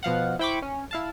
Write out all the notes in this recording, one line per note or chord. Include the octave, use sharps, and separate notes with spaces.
B2 F3 F5 F#5
E4 C5 G5 B5 C#6 D6
C#4
E4 F5 A5